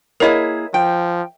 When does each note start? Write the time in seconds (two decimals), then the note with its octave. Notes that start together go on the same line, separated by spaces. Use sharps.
0.20 A#3 E4 G#4 A#4 C#5 D#5
0.74 F3 G5